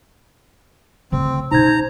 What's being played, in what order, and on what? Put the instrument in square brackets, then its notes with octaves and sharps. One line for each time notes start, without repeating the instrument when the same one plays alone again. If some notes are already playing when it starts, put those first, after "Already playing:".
[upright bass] D2 C#3 [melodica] C4
[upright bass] B2 C#4 [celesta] D#4 G#6 [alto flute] C5 [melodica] A#5